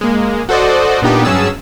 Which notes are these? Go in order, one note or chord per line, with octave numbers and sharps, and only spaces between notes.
G#3 A#3
F#4 A4 C5 D5 D#5
A#2 B3 D4 D#4 G4
G2 F#3 C#4 G#4 A5 E6